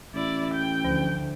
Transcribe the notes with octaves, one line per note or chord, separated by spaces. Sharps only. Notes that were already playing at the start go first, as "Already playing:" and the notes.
A1 E4 D5
G5
D2 F3